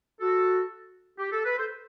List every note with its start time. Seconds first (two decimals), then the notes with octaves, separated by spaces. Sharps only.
0.21 F#4 A4
1.18 G4
1.32 A4
1.45 B4
1.57 A4 C5